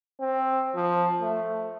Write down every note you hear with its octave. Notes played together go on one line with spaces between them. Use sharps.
C4
F3
A3